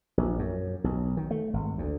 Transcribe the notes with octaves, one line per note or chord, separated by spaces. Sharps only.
A#1
F#2
B1
D#3
A3
G#1
D2